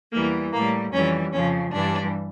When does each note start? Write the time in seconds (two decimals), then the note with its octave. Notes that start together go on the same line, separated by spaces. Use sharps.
0.12 E2 E3 G3 A#3
0.52 A2 G3 A#3
0.92 F2 E3 G3 C#4
1.32 F2 C#3 F3 C#4
1.71 G2 E3 G3 D4